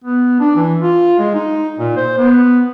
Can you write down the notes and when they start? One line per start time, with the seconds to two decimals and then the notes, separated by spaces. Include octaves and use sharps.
0.04 B3
0.40 D4
0.56 E3
0.82 F4
1.19 G#3
1.35 D#4
1.79 A#2
1.97 C5
2.19 B3